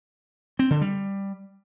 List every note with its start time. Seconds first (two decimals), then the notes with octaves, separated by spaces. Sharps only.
0.59 C4
0.70 D3
0.81 G3